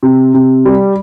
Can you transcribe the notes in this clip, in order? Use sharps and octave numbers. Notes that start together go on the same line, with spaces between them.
C3
C3
G3